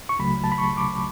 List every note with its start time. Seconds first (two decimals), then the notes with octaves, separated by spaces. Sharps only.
0.09 C#6
0.19 C#2 C#3 F#3 A3 B5
0.44 A5
0.52 B5
0.58 C#6
0.77 D6